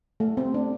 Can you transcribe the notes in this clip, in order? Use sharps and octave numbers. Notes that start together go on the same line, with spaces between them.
A3
C4
D4